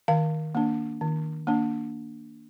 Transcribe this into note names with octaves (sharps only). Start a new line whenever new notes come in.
D#3 F5
A#3 D4
D#3
A#3 D4